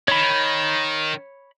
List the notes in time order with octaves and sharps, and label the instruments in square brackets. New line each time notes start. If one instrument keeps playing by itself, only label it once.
[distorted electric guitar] D#3 [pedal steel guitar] C#5 B5